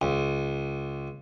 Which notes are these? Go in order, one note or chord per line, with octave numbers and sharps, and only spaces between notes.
C#2